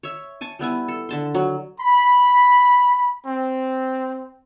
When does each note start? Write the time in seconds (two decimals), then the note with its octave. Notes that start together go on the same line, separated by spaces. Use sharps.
0.03 C#5 E5
0.41 G#5 A5 C#6
0.59 G3 B3 E4 G#5
0.88 A4
1.09 D3 A5 C6
1.35 F#3
1.79 B5
3.26 C4